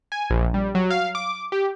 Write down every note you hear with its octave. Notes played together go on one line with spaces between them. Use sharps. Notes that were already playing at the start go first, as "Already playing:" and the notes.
G#5
A#1
G3
F#3
F5
D6
G4